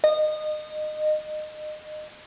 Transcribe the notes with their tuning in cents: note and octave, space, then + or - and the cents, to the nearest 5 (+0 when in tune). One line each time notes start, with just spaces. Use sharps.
D#5 -25